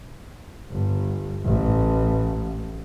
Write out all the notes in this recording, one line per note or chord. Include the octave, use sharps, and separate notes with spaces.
G1
A1